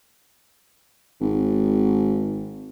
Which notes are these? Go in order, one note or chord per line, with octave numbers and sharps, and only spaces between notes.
G#1